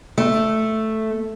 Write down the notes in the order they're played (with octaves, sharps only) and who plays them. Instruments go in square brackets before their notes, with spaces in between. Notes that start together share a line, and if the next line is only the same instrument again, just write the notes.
[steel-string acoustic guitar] A3